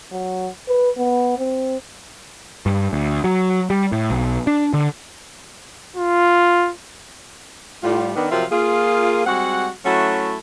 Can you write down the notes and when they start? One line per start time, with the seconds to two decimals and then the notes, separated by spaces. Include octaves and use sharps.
0.12 F#3
0.68 B4
0.97 B3
1.38 C4
2.66 G2
2.93 D2
3.24 F#3
3.70 G3
3.92 A2
4.10 B1
4.47 D4
4.73 D3
5.96 F4
7.83 A2 G3 F4
8.15 D#3 B3 D4
8.31 C3 F3 F#3 F4 A#4 E5
8.51 A#3 F4 G#4
9.26 G3 G#3 C4 F#4 F#5
9.85 F#3 A3 C#4 E4 F#4